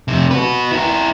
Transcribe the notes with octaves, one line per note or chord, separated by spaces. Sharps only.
F2 C3
F#4 B4
E4 A#4